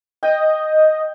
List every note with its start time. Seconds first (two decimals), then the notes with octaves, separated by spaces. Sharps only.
0.23 D#5 G5